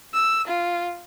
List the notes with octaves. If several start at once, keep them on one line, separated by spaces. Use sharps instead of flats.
E6
F4